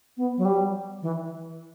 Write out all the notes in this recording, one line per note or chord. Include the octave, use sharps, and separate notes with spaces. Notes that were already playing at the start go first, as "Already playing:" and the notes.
B3
F#3
G3
E3